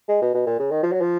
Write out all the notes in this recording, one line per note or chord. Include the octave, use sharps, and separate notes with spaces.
G#3
B2
B2
A#2
C#3
D#3
F3
F#3
F3